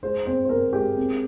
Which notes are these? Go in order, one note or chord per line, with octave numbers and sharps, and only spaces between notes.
G#3 C5
C4 C5
C5
C4 A#4
G#3 G4
C4